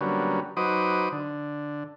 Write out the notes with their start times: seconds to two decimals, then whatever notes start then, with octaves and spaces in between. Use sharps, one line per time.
0.01 D3 F#3 G3 A#3 B3 C#4
0.57 F#3 D#4 B4 C5 D6 D#6
1.12 D3